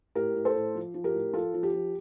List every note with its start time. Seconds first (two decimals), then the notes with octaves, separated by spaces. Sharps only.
0.15 A2 G4 A#4
0.35 A2
0.45 A4 C5
0.55 A2
0.75 F3
0.94 F3
1.04 G4 A#4
1.14 A2
1.33 F3 F4 A4
1.54 F3
1.63 G4
1.73 F3